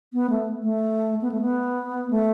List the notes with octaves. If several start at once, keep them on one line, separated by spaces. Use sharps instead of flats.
B3
A3
A3
B3
A3
B3
A3